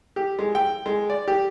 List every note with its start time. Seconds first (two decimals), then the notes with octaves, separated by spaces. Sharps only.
0.16 G4
0.39 G#3
0.55 G5
0.86 G#3
1.10 D5
1.28 G4